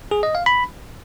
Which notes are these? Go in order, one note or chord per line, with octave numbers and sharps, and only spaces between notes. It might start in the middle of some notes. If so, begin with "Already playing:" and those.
G#4
D#5
F5
B5